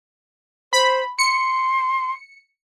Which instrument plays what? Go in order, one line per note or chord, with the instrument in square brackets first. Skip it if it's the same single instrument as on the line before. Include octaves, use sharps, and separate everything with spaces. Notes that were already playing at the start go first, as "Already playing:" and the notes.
[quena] C5 [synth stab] B5
[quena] C6 [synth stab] C#7